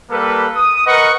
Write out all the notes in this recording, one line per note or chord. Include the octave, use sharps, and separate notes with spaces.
G3 A#3 A4 B4
D#6
A#4 B4 D#5 F#5 C#6